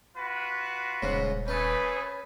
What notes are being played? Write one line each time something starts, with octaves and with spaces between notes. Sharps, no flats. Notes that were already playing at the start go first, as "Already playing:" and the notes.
F4 F#4 B4
D#1 G#2 C#3
A3 C#4 G#4 B4